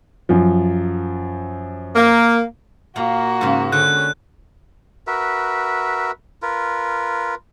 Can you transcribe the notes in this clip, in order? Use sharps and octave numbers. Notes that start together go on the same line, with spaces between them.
F#2 F3
A#3
A#2 A#3 F#4
G#2 C#3
D3 C#4 F#6
F#4 A#4 B4 E5
F4 A#4 B4